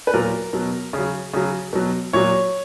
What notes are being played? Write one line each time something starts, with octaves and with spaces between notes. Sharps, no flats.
B4
A#2 F#3 A#4
B2 F#3
C#3
F#3
C#3 F#3
B2 F#3
A#2 F#3 C#5